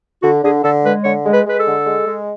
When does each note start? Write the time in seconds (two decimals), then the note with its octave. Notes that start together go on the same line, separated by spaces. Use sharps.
0.23 D3 F#4
0.43 D3 G#4
0.63 D3 A4
0.84 G#3 B4
1.04 D3 C#5
1.26 G#3
1.32 B4
1.45 G#3 B4
1.59 A4
1.66 D3
1.86 G#3
2.07 G#3